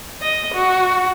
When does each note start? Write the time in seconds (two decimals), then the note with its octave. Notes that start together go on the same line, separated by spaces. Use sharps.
0.21 D#5
0.54 F#4